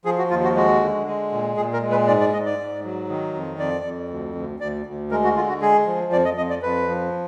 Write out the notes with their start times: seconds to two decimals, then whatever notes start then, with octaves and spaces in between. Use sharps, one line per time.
0.05 F3 G#4
0.18 F#4
0.30 D#2 F4
0.43 F#4
0.55 G#3 F#4
0.81 D3
1.07 G#3
1.32 A#2
1.56 A#2 G#4
1.73 A#4
1.82 G#3
1.91 B4
2.07 G#2 D5
2.21 D5
2.33 G#2 D#5
2.46 D5
2.58 G#2
2.84 F#3
3.09 D#3
3.34 F2
3.59 F2 D5
3.85 F2
4.10 D2
4.35 D2
4.60 D2 D5
4.86 D2
5.11 G#3 A#4
5.24 F#4
5.36 D3 F4
5.49 F#4
5.62 G#3 G#4
5.86 F3
6.12 F2 D5
6.25 D#5
6.37 F2 D#5
6.50 D5
6.63 F2 B4
6.88 F3